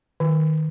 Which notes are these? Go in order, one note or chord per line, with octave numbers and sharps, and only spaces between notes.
D#3